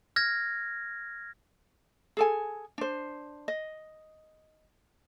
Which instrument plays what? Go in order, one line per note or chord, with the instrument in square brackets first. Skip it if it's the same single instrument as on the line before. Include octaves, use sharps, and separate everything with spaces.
[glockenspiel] F6 G#6 A#6
[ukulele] G#4 A4 G#5
D4 C5
D#5